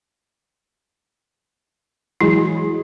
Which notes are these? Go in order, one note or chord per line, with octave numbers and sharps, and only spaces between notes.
E3 F#3 G#3 E4